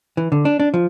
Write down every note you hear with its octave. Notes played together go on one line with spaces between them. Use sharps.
E3
D3
D4
D4
F3